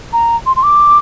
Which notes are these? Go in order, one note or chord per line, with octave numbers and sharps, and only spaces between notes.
A#5
C6
C6
D6